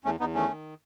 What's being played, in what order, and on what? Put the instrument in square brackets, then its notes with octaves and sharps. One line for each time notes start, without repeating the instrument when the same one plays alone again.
[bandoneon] E2 A3 C#4
E2 B3 D#4
D#3 A3 C#4
D#3